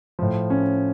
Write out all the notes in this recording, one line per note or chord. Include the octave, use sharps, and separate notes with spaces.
A2 F3
C#4